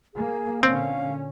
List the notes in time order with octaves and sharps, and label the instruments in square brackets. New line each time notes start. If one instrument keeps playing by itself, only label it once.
[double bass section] A#3 [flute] G#4
[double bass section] A#2 D3 C#4 [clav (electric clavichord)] C4 [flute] F5